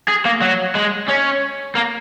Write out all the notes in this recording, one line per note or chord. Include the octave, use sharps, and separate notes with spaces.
G#4
A#3
F#3
G#3
C#4
A#3